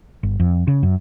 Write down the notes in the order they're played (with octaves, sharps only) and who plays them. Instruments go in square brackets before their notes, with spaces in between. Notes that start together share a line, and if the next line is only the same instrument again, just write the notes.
[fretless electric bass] G1
F2
C#3
F#2